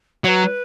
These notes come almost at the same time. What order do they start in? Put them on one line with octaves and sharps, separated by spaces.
F#3 C#5 B4